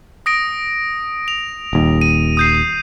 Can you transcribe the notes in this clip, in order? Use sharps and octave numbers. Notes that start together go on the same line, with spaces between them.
D#6 A#6 D7
F7
D#1 D#2
D#7
D#6 G6 C7